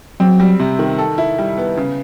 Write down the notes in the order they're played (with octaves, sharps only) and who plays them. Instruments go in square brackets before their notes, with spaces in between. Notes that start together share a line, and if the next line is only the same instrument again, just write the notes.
[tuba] F#3 [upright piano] C4
[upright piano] G3
C3
D#3
A4
E4
G3
B3
C#3